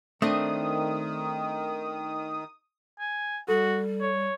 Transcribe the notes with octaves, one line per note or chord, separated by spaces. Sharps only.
D#3 A3 C4 D4 D#6
G#5
G3 F#4 A4
C#5